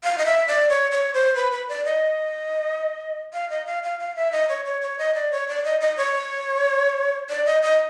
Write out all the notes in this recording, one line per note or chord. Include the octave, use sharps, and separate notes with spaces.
F5
D#5
E5
D5
C#5
C#5
C5
B4
B4
D5
D#5
F5
D#5
F5
F5
F5
E5
D#5
C#5
C#5
C#5
D#5
D5
C#5
D5
D#5
D#5
C#5
D5
D#5
D#5